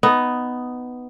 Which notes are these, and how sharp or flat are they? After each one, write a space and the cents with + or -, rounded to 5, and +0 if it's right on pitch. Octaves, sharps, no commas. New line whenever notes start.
B3 +10 D#4 +0